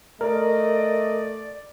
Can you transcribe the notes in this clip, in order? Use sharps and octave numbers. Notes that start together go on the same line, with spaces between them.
A3 A#4 D5 D#5